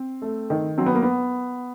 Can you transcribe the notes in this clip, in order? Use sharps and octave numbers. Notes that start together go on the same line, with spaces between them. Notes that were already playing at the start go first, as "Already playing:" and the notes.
Already playing: C4
A3
D#3
F#3 C4
B3
A#3
B3